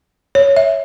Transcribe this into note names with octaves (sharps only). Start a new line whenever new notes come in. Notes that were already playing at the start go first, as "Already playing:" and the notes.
C#5
E5